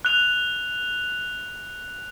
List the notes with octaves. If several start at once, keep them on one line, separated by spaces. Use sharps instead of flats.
F#6 F7